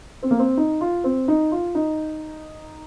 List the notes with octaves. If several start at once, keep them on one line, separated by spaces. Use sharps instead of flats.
C4
A#3
C4
D#4
F4
C4
D#4
F4
D#4